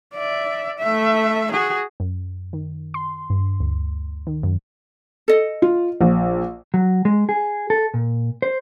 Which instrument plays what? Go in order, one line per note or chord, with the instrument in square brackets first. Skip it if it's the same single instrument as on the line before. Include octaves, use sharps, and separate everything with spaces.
[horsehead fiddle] D5 E5
A3 E5
F#4 G#4
[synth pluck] F#2
D#3
C6
G2
D2
D#3
F#2
[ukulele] A4 D#5
[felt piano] F4
A#1
[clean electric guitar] F#3
G#3
G#4
A4
A#2
C5